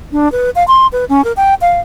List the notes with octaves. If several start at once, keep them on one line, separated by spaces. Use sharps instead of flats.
D4
B4
F5
C6
B4
C#4
A#4
G5
F5